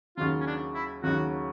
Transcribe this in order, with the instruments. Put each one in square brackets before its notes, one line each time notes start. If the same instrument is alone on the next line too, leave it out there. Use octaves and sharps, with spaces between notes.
[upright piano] D#2 C#3 F#3 [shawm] F4
[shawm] C#4
D4
E4
[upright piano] D#2 C#3 F#3 [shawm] F#4